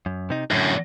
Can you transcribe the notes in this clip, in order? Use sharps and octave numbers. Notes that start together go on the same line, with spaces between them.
F#2
C3 D#4
F#2 A2 D3 C#4